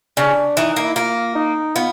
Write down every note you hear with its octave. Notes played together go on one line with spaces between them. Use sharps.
C#3 D4
E3 D#4
A#3
E4
A#3 F4
D#4
B3 F4